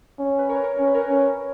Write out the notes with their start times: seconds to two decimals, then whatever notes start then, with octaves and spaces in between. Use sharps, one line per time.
0.19 C#4
0.38 B4
0.49 A#4 C#5
0.64 A#4 C#5
0.78 C#4
0.87 B4
0.94 A#4 C#5
1.09 C#4